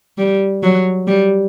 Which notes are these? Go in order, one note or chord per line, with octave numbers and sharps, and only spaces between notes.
G3
F#3
G3